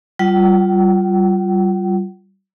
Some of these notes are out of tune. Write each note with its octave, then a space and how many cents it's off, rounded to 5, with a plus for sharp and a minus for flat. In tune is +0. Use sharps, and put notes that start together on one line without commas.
G3 -30 F4 +0 F#5 +45